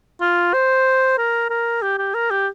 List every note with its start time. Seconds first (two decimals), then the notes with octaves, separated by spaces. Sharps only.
0.21 F4
0.54 C5
1.18 A#4
1.50 A#4
1.82 G4
1.98 G4
2.15 A#4
2.31 G4